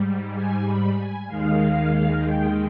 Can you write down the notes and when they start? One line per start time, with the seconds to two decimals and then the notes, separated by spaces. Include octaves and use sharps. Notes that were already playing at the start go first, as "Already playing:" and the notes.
Already playing: G#2 G3
0.32 G#5
0.63 B5
0.95 G#5
1.27 D#2 D#3 G#3 F5
2.21 G5